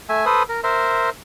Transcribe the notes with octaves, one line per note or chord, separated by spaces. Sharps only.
A3 E5 G#5
A4 B4 C5 D#6
A#4
A#4 C5 E5